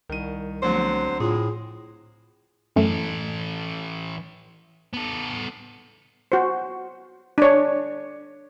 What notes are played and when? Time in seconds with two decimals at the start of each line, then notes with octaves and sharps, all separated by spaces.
0.09 C2 D#3 D#7
0.63 D3 F3 F#3 A3 B3 C4 C5
1.20 A2 F4 G#4 C6
2.76 F#2 E3 A3 A4
4.93 B3 A4
6.32 F#4 C5
7.38 D4 C#5